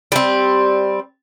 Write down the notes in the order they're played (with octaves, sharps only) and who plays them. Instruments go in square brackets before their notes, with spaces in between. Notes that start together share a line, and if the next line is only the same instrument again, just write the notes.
[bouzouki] G3 C4